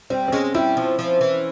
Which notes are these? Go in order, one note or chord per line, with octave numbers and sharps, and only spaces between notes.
G3 C4
C4
G#3 C#4
G3 E4
F3
F3
E3